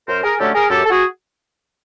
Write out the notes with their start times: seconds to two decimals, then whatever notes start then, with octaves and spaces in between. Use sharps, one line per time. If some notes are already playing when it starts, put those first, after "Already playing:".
0.08 F#2 A#4 C5
0.23 G#4 A#4
0.39 D3 F#3 A3 C#4 G4 A4
0.55 G#4 A#4
0.70 F#2 G4 A4
0.85 A4
0.90 F#4 G#4